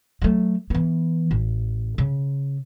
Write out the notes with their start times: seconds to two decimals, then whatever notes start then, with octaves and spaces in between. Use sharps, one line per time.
0.22 F#3 A3
0.70 E3 B3
1.31 A1
1.98 C#3